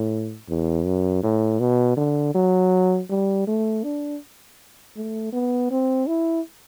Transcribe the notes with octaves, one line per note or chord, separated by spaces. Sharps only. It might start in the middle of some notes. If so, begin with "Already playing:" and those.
Already playing: A2
E2
F#2
A2
B2
D3
F#3
G3
A3
D4
A3
B3
C4
E4